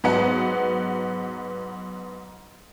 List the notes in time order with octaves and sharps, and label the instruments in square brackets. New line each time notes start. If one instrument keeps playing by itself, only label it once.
[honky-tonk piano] G#2 F#3 B3 F#5